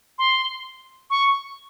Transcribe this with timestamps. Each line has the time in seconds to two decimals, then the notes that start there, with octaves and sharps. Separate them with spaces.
0.18 C6
1.10 C#6